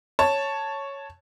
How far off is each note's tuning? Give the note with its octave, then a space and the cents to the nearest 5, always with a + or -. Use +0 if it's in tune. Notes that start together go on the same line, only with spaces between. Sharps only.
C#5 +0 A5 +0